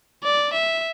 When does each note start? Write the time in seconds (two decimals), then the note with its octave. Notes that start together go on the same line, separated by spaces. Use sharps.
0.24 D5
0.53 E5